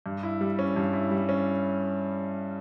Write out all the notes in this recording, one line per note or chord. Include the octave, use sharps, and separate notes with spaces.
G2
E4
G3
C#4
G2
E4
G3
C#4